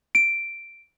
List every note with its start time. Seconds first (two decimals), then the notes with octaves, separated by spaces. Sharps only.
0.15 D7